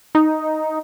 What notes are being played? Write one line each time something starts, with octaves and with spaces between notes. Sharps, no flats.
D#4